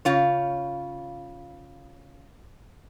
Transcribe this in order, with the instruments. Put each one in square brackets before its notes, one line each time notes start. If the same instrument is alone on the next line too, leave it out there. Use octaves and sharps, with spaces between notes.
[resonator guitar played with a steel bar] C#3 F4 C#5